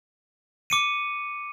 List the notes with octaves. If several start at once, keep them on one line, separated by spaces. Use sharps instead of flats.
D6 C#7 D#7